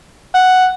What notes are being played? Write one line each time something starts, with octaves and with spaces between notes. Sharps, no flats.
F#5